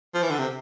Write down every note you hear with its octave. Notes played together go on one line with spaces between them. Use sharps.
F3
E3
D3
C3